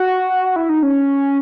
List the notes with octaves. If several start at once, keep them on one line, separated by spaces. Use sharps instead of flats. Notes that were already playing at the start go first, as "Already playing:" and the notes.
Already playing: F#4
E4
D#4
C#4